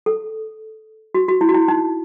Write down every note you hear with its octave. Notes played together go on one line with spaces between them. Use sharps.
A4
F#4
F#4
E4
F#4
E4
D#4